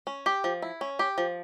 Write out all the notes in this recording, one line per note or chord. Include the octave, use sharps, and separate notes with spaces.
C#4
G4
F3
E4
C#4
G4
F3